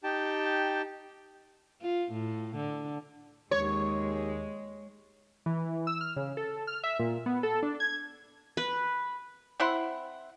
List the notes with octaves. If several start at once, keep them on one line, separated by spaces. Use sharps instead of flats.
D#4 G4 G5 A5
F4
A2
D3
D#2 G#3 C#5
E3
E6
F6
C#3
A4
F6
E5
A#2
B3
A4
D4
G#6
B4
C4 E4 F#5 C6